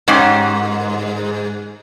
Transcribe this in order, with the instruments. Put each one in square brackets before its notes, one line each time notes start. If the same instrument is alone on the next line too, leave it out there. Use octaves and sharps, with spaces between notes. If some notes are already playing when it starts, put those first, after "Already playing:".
[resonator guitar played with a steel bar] G#2 [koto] C#4 D#4 G4